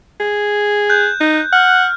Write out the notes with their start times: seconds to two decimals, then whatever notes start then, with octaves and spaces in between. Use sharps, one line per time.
0.20 G#4
0.90 F#6 G6
1.20 D#4
1.53 F#5 F6